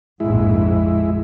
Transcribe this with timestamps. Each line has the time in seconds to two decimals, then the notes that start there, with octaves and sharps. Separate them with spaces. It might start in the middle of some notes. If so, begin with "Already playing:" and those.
0.20 A#1 F2 G#2 G#3 E4